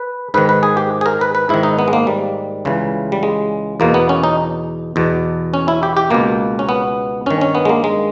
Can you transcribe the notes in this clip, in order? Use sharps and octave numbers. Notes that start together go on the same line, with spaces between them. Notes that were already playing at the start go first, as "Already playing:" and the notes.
Already playing: B4
G#2 D#3 B4
B4
G#4
G4
G#4
A#4
B4
B4
G#2 D#3 E4
D#4
B3
G#3
A#3
G3
C#2 C#3 E3
G3
G#3
E2 B2 A#3
B3
C#4
D#4
E2 B2
C#4
E4
G4
G4
C#2 B2 A#3
C#4
B3
G2 D#3 C#4
C#4
B3
G#3
A#3
G#3